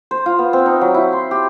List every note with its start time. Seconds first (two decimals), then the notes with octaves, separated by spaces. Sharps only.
0.11 C5
0.26 F4
0.39 B3
0.53 C4
0.66 D#4
0.81 F#3
0.94 E4
1.13 C6
1.31 G4